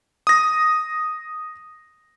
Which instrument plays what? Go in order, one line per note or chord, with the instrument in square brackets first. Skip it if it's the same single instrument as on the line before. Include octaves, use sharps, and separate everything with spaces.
[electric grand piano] D#6 A#6